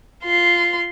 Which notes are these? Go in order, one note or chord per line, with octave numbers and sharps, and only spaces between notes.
F4 C6